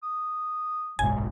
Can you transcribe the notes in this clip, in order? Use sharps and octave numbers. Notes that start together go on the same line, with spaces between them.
D#6
F#1 B1 G#2 F#3 G#5